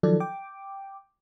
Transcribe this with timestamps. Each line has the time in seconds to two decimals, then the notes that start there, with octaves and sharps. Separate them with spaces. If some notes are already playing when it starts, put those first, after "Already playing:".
0.03 D#3 F3 F#3 A4 D5
0.20 G5 D6